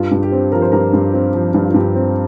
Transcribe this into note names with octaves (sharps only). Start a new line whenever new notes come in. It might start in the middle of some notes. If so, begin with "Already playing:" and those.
Already playing: G2 F4
G2
G4
C4
F3 A#4
C5
G2 A#4
G2
C4
F3
G2
F4
G2 G4
C4